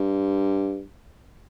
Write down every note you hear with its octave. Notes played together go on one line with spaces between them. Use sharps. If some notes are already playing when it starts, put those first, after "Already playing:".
Already playing: G2